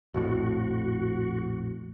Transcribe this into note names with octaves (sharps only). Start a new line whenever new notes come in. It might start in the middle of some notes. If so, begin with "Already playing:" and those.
A#1 F2 A2 F#4